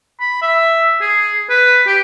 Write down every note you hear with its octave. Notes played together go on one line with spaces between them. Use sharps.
B5
E5
G#4
B4
G4